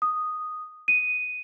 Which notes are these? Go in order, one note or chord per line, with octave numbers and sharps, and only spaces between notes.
D#6
D#7